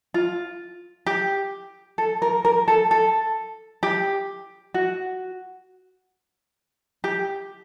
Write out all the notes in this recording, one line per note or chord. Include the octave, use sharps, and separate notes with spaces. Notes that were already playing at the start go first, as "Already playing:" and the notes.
F4
G4
A4
A#4
A#4
A4
A4
G4
F#4
G4